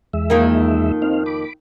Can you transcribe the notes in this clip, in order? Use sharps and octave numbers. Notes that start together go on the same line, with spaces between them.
E2 G#3 E5
F2 D#3 A#3
C4 D#4 F5
B5 D6